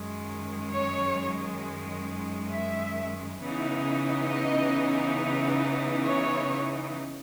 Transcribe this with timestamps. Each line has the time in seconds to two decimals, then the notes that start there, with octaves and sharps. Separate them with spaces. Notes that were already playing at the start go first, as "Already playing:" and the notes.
Already playing: F#2 D#3 G#3
0.73 C#5
2.51 E5
3.40 C#3 E3 B3 D#4
4.29 D#5
6.07 C#5